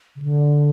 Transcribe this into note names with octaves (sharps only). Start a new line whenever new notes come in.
C#3
D3